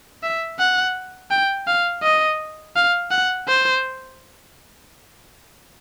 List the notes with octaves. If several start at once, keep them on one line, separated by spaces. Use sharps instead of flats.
E5
F#5
G5
F5
D#5
F5
F#5
C5